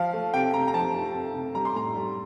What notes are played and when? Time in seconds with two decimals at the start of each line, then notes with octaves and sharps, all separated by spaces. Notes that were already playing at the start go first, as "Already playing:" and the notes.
Already playing: F3 F5
0.13 A3
0.34 C3 G5
0.54 C3 A#5
0.68 A#5
0.74 F3 A5
0.94 A3
1.14 C3
1.34 C3
1.55 G3 A#5
1.65 C6
1.75 A2 A#5
1.95 G3